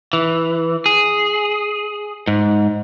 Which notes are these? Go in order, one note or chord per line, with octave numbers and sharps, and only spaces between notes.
E3
G#4
G#2